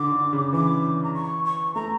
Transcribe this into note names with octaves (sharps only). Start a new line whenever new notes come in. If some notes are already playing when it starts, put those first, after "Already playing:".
Already playing: D3 D6
D3
C#3
E3 D6
A#5
C#6
C#6
A3 A#5